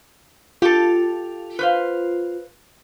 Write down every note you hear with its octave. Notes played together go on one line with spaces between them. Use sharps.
F4 G4 A4
B4 C5 F5